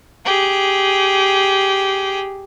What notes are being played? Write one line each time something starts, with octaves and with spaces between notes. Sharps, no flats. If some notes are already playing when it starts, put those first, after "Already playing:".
G4 G#4